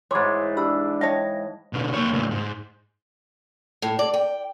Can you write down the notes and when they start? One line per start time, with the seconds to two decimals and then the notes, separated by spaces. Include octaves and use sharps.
0.11 G#2 E3 C#5 C6 D6 G#6
0.57 D4 G4 G#4 B5 E6
1.01 C#5 D#5 F5 G5 A5 A#6
1.73 B2 D3
1.94 A#3 C#5
2.13 C#2 A2
2.31 G#2
3.82 A2
3.99 D5
4.14 G5